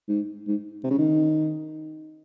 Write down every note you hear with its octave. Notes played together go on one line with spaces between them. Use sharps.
G#2
G#2
C3
C#3
D#3